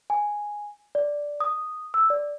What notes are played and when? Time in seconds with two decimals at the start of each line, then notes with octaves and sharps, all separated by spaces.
0.10 G#5
0.95 D5
1.40 D#6
1.94 E6
2.10 D5